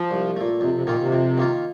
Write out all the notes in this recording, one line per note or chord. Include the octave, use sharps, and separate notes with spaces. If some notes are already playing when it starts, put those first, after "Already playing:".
Already playing: F3
C2
A#2 A3
F2 C3
C3
A#2 D#3 A#3 F4
C3
F2
D#3 A#3 F4